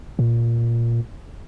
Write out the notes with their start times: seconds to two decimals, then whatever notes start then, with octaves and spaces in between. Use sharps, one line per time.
0.19 A#2